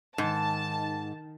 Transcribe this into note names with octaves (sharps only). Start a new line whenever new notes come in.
G#2 D#3 A5